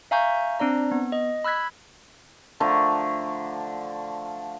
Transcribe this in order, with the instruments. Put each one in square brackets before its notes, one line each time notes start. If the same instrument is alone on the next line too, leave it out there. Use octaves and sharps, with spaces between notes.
[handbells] E5 F5 G#5 A#5 C#6 G6
C4 D4 D5 A#5
B3
D#5
B5 E6 F#6 G#6 B6
[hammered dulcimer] D3 F3 A3 A#5